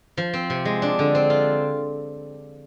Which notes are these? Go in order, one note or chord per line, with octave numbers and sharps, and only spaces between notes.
F3
C4
C3
G#3
D4
D3
C4
F4